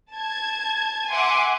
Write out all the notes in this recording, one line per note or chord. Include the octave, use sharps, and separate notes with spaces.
A5 G#6
E5 F#5 G#5 C6 D6